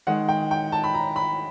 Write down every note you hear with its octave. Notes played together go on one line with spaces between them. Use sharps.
D#3 G#3 F#5
G5
G5
A5
B5
A#5
B5